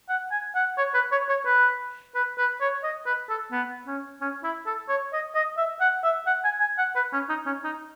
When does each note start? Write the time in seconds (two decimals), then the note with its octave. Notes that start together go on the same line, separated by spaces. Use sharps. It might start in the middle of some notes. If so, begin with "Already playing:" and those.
0.09 F#5
0.32 G#5
0.55 F#5
0.78 C#5
0.95 B4
1.12 C#5
1.29 C#5
1.46 B4
2.15 B4
2.38 B4
2.61 C#5
2.84 D#5
3.06 B4
3.29 A4
3.52 B3
3.87 C#4
4.21 C#4
4.44 E4
4.66 A4
4.89 C#5
5.13 D#5
5.35 D#5
5.58 E5
5.81 F#5
6.04 E5
6.27 F#5
6.45 G#5
6.60 G#5
6.78 F#5
6.95 B4
7.13 C#4
7.29 D#4
7.46 C#4
7.64 D#4